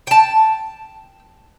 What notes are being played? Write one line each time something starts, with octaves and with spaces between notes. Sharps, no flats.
G5 A5